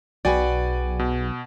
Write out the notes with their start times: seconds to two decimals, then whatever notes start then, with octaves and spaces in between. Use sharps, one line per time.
0.25 B1 F#4 G#4 B4 D5 G5 G#5
0.99 B2